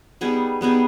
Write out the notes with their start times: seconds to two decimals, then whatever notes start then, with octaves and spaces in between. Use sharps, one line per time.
0.21 G3 B3 D#4 G#4
0.61 G3 B3 D#4 G#4